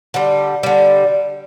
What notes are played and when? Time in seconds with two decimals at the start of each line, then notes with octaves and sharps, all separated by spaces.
0.14 D3 G3
0.63 D3 G3